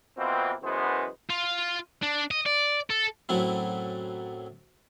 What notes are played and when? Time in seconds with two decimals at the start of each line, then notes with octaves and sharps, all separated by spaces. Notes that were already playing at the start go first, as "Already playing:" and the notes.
0.17 B2 E3 F3 A#3 C4
0.63 F#2 B2 E3 G#3 B3 C5
1.30 F4
2.03 D4
2.31 D#5
2.46 D5
2.90 A4
3.29 F#2 A2 F#3 A3 C4 E4